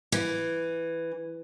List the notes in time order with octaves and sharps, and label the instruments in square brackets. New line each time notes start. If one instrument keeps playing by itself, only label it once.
[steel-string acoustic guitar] E3